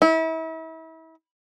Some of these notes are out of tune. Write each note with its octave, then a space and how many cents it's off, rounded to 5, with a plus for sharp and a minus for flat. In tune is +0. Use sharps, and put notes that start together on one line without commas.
E4 -35